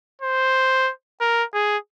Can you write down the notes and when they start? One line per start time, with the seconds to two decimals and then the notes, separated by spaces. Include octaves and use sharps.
0.21 C5
1.21 A#4
1.54 G#4